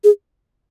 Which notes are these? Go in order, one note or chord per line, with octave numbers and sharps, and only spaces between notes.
G#4